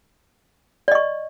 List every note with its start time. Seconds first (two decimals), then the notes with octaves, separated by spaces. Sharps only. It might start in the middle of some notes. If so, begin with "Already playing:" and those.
0.88 D5
0.92 D#5
0.95 C#6